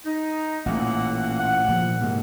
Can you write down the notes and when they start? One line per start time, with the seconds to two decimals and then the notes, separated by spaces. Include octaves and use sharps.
0.05 D#4
0.66 A1 A#2 A3 A#3 F#5
1.38 F#5
1.68 A#2 F3
2.01 G#2 C3 A#3